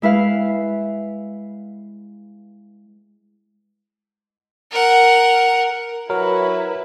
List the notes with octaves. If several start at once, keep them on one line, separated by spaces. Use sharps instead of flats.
G#3 E4 B4 F5
A#4 F#5
F#3 E4 A#4 B4